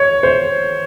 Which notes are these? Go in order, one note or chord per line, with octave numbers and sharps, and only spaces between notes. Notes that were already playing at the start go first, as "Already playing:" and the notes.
Already playing: C#5
C5